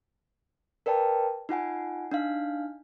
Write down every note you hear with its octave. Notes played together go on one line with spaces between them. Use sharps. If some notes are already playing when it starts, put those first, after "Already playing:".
A#4 B4 D5 G5 A5
D#4 F4 F#5 G#5
D4 D#4 F5